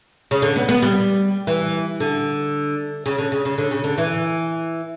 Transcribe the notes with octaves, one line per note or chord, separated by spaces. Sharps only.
C#3
D3
B3
B3
G3
E3
D3
C#3
D3
C#3
C#3
D3
C#3
D3
E3